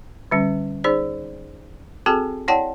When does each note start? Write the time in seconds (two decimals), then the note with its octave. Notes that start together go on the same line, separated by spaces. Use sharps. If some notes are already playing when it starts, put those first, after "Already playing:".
0.31 D3 G3 C#4
0.84 D#4 G#4 C5 D5
2.06 C4 F#4 G#4 A4 G5 A5
2.48 E4 C#5 D5 F#5 G5 A5